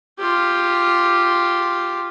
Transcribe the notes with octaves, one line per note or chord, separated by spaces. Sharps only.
F4 G4